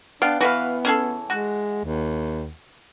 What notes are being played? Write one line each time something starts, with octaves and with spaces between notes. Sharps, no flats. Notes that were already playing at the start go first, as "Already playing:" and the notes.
B3 D4 F5 G5
E3 B3 F#4 B4 F5
C#4 G#4 A4
G#3 F#4
D#2